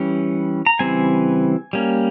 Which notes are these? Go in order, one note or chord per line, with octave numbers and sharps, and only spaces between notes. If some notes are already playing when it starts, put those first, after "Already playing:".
Already playing: E3 G3 C#4
A#5
C#3 E3 G3 C4 G#5
G3 A#3 C#4